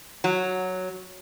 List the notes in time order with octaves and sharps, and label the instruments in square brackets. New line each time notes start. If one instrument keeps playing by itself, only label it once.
[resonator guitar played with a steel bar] F#3